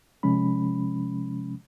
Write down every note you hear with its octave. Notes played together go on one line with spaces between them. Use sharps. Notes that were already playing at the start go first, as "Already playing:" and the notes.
C3 F3 G#3 C#4 B5